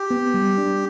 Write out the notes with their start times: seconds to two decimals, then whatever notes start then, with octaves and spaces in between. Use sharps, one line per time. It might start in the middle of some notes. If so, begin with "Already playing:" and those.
Already playing: G4
0.10 B3
0.34 G3
0.58 D4